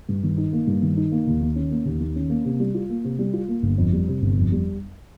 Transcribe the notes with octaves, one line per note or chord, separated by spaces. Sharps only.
G2
D#3
D#4
A#3
G2
D#3
D#4
A#3
D#2
D#3
C#4
A#3
D#2
D#3
C#4
A#3
C3
G3
F4
A#3
C3
G3
F4
A#3
G1
F2
G3
C3
G1
F2
G3